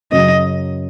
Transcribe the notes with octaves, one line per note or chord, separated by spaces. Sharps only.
F#2 C#3 F#3 D#5